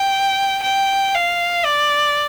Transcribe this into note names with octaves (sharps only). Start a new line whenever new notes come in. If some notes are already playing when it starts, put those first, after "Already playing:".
Already playing: G5
G5
F5
D5